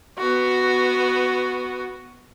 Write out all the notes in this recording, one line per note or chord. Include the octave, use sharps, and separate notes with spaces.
B3 F#4